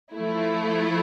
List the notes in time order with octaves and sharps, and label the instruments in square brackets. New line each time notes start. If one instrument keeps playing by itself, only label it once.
[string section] F3 A3 E4